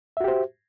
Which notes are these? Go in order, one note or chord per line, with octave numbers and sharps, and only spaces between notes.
F#4 G4 C5 E5